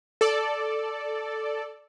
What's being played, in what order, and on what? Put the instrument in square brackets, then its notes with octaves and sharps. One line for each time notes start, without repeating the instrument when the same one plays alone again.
[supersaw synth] A4 D5